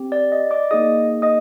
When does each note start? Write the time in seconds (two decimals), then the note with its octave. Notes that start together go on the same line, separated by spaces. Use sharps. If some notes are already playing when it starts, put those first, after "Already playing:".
Already playing: C4 G4
0.12 D5
0.32 D#5
0.51 D5 D6
0.71 A#3 D#4 G#4 D#5 D#6
1.22 D#5 D#6